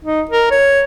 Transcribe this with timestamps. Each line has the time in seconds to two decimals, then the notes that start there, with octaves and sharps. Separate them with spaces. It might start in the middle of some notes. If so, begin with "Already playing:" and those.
0.05 D#4
0.31 A#4
0.51 C#5